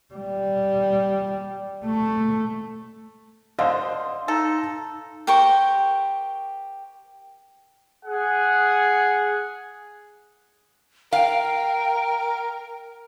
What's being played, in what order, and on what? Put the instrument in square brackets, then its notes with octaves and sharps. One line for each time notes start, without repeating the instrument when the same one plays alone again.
[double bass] G3
A3
[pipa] D3 [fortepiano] C5 D#5 [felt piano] F5 C6
[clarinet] D#4 [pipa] A4
[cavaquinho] G4 A#4 C5 C#6
[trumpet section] G#4 F#5
[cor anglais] A#4 [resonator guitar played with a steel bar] F5 [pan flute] G5